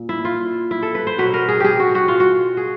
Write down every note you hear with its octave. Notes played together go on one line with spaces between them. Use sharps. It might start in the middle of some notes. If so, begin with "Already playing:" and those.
Already playing: A#2
E4
F4
E4
A4
B4
C5
B2 F#3 B4
A#4
G#4
G4 G#4
F#4
F#4
F4
F#4
G#4